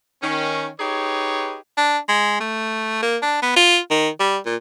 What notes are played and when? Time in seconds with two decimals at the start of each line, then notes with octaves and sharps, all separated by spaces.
0.23 D#3 C#4
0.80 D#4 G4 G#4 B4 C#5
1.77 D4
2.08 G#3
2.40 A3
3.02 A#3
3.22 D4
3.42 B3
3.56 F4
3.91 D#3
4.19 G3
4.46 A#2